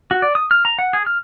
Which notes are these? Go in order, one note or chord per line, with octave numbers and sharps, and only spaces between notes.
F#4
D5
D#6
F6
A#5
F#5
G#4
F6